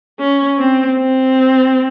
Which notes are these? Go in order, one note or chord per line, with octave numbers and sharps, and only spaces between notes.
C#4
C4
C4